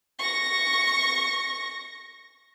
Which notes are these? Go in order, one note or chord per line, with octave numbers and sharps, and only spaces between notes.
C#6 A#6